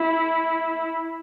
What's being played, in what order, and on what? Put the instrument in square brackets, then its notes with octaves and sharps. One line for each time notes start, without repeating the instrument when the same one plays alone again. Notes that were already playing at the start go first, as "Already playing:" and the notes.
Already playing: [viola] E4